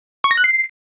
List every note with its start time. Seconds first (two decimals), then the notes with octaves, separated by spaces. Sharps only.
0.24 C#6
0.31 A#6
0.37 F#6
0.44 C7